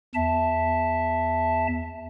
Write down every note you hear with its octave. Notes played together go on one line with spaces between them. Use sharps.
E2 E5 A5